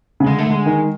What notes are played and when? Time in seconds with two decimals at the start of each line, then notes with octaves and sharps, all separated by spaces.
0.20 C#3
0.26 D3 G#3
0.39 A3
0.47 D3 G#3
0.66 D#3